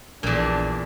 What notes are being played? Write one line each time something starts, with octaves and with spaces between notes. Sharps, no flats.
A#1 E2 A#2 D4